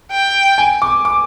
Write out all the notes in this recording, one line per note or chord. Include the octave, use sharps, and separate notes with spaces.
G5
G#5
D6
D6